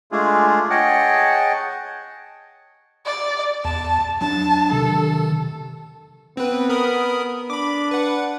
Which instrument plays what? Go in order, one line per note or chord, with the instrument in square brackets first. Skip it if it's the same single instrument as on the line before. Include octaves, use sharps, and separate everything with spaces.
[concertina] G#3 A3 D4 F4 G#4
G#4 C#5 D#5 F#5 G5 A5
[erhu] D5
[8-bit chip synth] E2 [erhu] A5
[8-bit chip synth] F#3 D4 [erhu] A5
[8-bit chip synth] C3 D#3 [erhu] A4
[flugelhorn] B3 [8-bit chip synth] C4 B4
[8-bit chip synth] A#4 B5 D#6
[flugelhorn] D4 [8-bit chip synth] B5 D6
[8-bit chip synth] B4 F#5